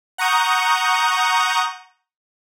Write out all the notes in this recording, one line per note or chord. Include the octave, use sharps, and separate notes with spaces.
F#5 A#5 C#6 D#6 G6